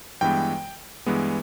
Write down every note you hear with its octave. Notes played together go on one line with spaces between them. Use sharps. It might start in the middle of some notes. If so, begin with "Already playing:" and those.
G2 E3 G#3 B3 G5
G2 E3 G#3 B3